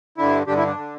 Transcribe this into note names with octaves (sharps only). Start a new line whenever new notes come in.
G2 D3 E4
G2 D3 D4 G4
E4
D4
D3